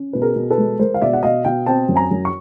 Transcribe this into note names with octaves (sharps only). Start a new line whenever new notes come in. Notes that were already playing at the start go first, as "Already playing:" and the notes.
Already playing: C#4
B2 B4
G#4 A#4
B2
A4 B4
G#3
G#3 A#4 C5
F5
B2 D5 E5
F#5
B2 D#5 F5
B2 F5 G5
C4 G5 A5
F#2
G#5 A#5
F#2
C#6